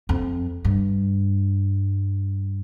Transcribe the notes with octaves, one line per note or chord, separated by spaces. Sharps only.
F2
G2